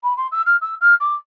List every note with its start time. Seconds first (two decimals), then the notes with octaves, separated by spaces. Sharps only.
0.03 B5
0.17 C6
0.31 E6
0.46 F6
0.61 E6
0.81 F6
1.00 D6